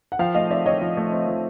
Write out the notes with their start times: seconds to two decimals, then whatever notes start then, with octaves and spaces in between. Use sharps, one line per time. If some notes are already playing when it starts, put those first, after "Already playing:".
0.12 F#5
0.19 F3 F5 G5
0.35 A3 D#5 F5
0.50 C4 D5 E5
0.66 F3 C#5 D#5
0.81 F3
0.97 A3
1.12 C4
1.28 F3